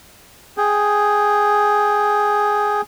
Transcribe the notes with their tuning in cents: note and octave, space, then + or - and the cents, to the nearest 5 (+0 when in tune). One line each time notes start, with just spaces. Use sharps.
G#4 +0 G5 +5